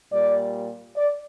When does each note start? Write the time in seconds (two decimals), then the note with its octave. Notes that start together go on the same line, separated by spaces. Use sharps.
0.12 A#2 G3 D5
0.96 D5